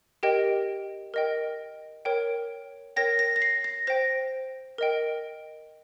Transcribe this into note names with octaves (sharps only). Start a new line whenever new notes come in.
G4 A#4 D#5 G5
A#4 D#5 G5
A#4 C#5 G5
A#4 C#5 G5 A#6
A#6
A#6
C7
A#6
C5 G5 A#6
A#4 D#5 G5